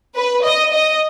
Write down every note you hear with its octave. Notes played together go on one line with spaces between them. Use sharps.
B4
D#5
D#5